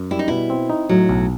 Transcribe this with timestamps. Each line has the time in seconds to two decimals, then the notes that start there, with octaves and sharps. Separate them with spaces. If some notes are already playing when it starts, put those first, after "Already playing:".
Already playing: F#2
0.11 G3 E4
0.19 D#4
0.28 B2 E4
0.50 C4
0.70 D#4
0.89 A2 F#3
1.09 B1